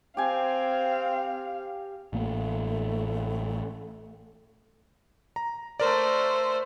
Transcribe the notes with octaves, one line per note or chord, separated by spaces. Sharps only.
C4 G4 F5 G#5
A1 A3 A#3
A#5
A3 A#4 C5 D5